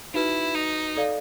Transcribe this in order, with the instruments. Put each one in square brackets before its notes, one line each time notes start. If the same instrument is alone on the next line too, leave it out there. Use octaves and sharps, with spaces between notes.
[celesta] D#4 F#4 B4 [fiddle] E4
[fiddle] D#4
[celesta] A4 D5 F5